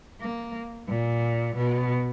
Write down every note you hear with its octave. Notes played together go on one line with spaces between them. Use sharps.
A#3
A#2
B2